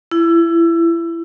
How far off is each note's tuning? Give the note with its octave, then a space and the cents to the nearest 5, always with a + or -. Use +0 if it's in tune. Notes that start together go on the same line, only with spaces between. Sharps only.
E4 +25